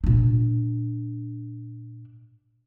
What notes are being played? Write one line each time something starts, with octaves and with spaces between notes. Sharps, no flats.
A#2 D4